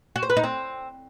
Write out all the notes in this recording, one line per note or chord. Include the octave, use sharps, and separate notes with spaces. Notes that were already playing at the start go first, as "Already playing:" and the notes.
F#4
C5
B4
D#4
C4